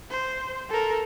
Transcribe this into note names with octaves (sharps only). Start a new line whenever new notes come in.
C5
A4 A#4